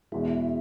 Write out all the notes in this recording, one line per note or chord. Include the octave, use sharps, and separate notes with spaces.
E2 B2 G#3 E4